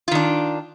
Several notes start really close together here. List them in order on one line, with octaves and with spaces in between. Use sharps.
F4 D#3 D4